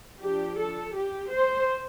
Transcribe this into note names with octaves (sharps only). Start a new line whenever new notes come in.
F3 D4 G4
A4
G4
C5